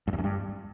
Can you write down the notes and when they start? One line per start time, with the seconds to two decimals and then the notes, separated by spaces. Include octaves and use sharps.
0.07 G2
0.13 E2
0.18 F#2
0.24 G2